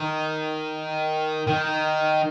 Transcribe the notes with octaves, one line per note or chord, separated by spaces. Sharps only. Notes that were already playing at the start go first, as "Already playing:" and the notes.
Already playing: D#3
D#3